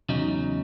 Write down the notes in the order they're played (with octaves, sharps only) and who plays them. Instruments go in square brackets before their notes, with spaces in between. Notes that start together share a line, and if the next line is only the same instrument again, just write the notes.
[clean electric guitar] E2 C#3 F#3 D#4